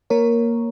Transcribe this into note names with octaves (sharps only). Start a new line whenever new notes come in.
A#3 A#4 C#5